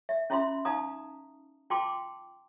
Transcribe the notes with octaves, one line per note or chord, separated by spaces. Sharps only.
E5
C#4 E4 F4 E5 B5 C6
D#4 F5 A5 A#5 D#6
F4 G5 A5 C6 D6